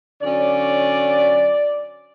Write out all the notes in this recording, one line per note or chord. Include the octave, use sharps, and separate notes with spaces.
D3 F#3 C#4 D5